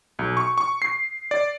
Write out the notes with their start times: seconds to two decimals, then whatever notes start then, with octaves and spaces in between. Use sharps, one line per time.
0.19 B1
0.37 C#6
0.58 C#6
0.82 C7
1.31 D5